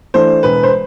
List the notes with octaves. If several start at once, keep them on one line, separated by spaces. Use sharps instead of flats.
E3 A3 D4 C5
E1 B4
C5